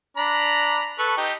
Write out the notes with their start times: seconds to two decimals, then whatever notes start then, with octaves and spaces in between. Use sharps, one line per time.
0.17 D4 A#5 B5
0.99 A4 B4 C#6
1.17 D#4 G4